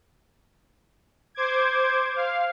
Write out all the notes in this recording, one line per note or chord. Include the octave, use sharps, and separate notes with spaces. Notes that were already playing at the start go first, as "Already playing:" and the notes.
C5 D6 G#6
F5